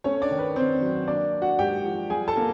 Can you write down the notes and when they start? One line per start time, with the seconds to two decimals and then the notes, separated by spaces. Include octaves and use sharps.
0.04 A3 C#4 C#5
0.22 D4 D5
0.31 D#3
0.39 B4
0.56 D#3 C4 C5
0.82 F#3
1.07 A#3 D4 D5
1.33 D4
1.42 F#4 F#5
1.59 G#2 G4 G5
1.85 F3
2.10 G3 G#4 G#5
2.28 A4 A5
2.36 A#3